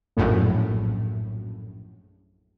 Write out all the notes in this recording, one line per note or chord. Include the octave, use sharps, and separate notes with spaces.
A#1 F#2 A2